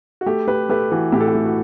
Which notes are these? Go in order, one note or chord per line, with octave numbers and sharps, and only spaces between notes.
F#4
A3 G4
A3 G4 B4
A3 G4 B4
E3 F#4 A4
A2 G4
A4
G4
A3
F#4